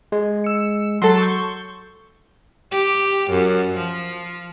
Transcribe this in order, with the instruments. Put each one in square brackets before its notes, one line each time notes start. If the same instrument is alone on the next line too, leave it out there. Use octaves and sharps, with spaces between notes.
[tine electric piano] G#3
[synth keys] E6 C#7
[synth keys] F#3 A4 A5 [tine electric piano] C6
[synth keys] C#6 G6
[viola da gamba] G4
F#2
F3